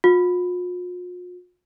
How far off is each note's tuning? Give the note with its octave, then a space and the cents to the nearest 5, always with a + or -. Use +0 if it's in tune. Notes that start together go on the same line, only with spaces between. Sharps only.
F4 +45